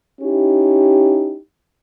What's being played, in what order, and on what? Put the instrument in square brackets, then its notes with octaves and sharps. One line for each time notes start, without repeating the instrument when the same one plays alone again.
[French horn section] C#4 D#4 E4 G4